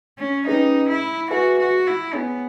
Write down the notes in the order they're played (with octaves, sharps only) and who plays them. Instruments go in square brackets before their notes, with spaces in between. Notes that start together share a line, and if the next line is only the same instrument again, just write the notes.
[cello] C#4
[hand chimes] C#4 G#4 B4 D#5 [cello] D#4
[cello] E4
[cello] F#4 [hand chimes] G#4 B4 E5 G#5
[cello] F#4
E4
[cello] B3 [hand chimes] G#4 C#5 G#5